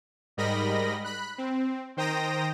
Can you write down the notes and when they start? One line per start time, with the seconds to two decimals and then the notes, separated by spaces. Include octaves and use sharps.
0.37 G#2 G3 A#4 D#5 B5 A#6
1.04 B5 F#6
1.38 C4
1.97 D#3 C5 G5 A#5 D#6 A#6